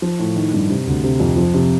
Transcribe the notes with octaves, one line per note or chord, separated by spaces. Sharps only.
F3
A2
D#3
G2
C3
D2
C3
F2
F3
C3